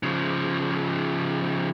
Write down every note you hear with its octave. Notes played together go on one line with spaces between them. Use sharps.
C#3 F3